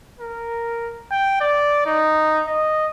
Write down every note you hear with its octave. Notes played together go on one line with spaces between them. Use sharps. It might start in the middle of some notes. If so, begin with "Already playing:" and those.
A#4
G5
D5
D#4
D#5